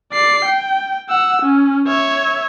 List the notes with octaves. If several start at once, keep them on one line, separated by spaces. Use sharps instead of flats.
D5 C7
G5
F#5 E6
C#4
C#5 E5